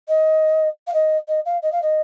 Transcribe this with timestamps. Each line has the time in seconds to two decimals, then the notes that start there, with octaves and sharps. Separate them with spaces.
0.08 D#5
0.87 F5
0.93 D#5
1.28 D#5
1.45 F5
1.62 D#5
1.72 F5
1.82 D#5